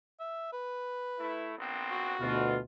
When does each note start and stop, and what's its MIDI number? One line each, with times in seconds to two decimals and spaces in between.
0.20 0.50 76
0.52 1.50 71
1.19 1.53 57
1.19 1.53 64
1.58 2.14 34
1.58 2.14 59
1.58 2.14 60
1.91 2.52 66
2.20 2.58 38
2.20 2.58 47
2.20 2.57 52
2.20 2.57 65